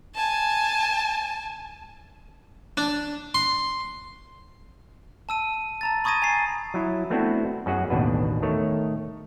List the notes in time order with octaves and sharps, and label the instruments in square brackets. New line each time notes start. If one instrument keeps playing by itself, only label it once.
[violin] G#5 A5
[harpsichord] D4
C6
[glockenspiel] A5 E6 D#7
A5 A#5 A6
B5 C#6 D#6 G#6 A#6 D#7
G#5 A#5 A6 C7
[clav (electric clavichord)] F#3 E4
A3 B3 C4 D4 E4 F#4
F#2 C#4 F#4 G#4 F#5
A1 D#2 B2 D4 B4
D#3 A3 C#5